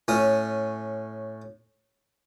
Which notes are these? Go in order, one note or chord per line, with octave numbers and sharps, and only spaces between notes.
A2 C#4 D#6